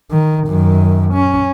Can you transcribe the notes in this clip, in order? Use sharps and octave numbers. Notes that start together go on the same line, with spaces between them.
D#3
F#2 D#3
C#4